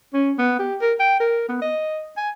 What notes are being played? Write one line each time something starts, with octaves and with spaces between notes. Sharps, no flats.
C#4
B3
G4
A#4
G5
A#4
B3
D#5
G#5